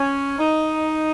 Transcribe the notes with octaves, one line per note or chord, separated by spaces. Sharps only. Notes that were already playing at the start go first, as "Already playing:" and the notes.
Already playing: C#4
D#4